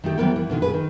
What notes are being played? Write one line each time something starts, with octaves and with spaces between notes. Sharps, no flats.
D#3 A3 G4
E3 F3 G3 B3 A#4 G5
E3
B2 D3 D#3
G#4 B4
D#3